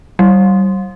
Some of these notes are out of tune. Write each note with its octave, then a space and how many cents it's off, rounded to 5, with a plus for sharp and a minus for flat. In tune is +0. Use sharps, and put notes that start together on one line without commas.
G3 -35